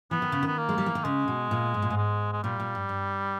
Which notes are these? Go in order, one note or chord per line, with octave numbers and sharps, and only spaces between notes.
E3 B3
D#3
C#3
D#3 B3
A#3
G#3
G3
E3
D#3
C#3 G#3
B2
A#2
G#2
A#2
G#2
G#3
G#3
A#2 G3
A#2
G2
G2